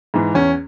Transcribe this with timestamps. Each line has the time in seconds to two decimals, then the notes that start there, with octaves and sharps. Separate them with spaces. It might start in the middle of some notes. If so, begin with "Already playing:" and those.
0.14 G#2 E3
0.34 E2 C#4